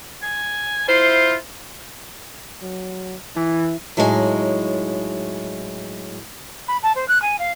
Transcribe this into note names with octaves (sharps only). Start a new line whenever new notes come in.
G#5
E4 F4 C5
F#3
E3 E4
A2 F#3 G#3 D#4 C5 G#5
B5
A5
C5
F#6
G#5
F5